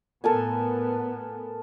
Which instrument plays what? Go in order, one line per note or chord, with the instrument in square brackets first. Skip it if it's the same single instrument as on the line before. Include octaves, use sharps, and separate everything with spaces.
[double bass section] A2 B3 [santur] A4 A#4 G#5